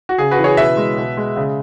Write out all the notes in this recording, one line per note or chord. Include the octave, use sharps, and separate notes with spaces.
F#4
C#3 G#4
F#4 B4
E3
G#4 C#5
B2 B4 E5
G#3
B2
G#3
C#3